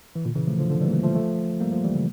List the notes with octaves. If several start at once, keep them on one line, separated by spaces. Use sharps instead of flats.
E3
A#2 D3
C#3 E3
F3 A3
D3 F3
D3 F3
E3 G3
A#3
F3 A3
F3 A3
F3 A3
G3 A#3
F3 A3
E3 G3
C#3 E3